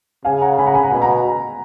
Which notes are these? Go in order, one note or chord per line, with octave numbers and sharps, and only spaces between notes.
C#3 F5 G#5
F#5 A#5
G#5 B5
F#5 A#5
G#5 B5
F#5 A#5
B2 G#5 B5
F#5 A#5